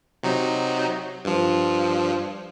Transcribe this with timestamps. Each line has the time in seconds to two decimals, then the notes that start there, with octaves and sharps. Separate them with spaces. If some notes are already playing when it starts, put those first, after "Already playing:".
0.23 C3 F#3 D#4
1.25 G2 F3